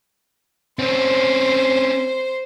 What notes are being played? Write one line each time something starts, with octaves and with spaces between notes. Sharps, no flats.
C4 C#4 C5